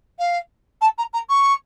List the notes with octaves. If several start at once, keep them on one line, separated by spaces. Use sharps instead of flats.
F5
A5
A#5
A#5
C#6